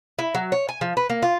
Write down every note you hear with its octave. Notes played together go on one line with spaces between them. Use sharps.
E4
F#3
C#5
G#5
F3
B4
A#3
F4